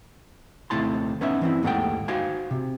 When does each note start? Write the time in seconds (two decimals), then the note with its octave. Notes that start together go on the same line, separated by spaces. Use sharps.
0.70 D#2 C3 A3 E4 A5 C6
1.21 B3 C#4 D#4 E5
1.41 E3 C4 E4
1.63 D#2 G#2 A3 A#3 F#5 G5
2.08 D#4 F#4 C5 F5 G#5
2.51 C3